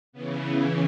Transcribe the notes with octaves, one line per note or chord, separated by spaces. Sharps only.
C#3 E3 B3
C#3 E3 B3